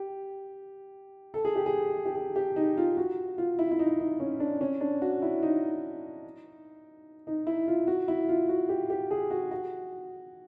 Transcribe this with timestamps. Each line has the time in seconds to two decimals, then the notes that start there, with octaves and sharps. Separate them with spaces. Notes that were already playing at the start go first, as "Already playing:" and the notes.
Already playing: G4
1.34 A4
1.45 G#4
1.56 G4
1.66 G#4
2.05 G4
2.16 G#4
2.36 G4
2.56 D#4
2.77 F4
2.97 F#4
3.38 F4
3.59 E4
3.71 E4
3.79 D#4
4.00 D#4
4.20 C#4
4.40 D4
4.61 C#4
4.81 D4
5.02 F#4
5.22 E4
5.43 D#4
7.27 D#4
7.47 E4
7.68 F4
7.88 F#4
8.08 E4
8.29 F4
8.49 F#4
8.69 G4
8.90 G4
9.11 G#4
9.31 F#4
9.51 F#4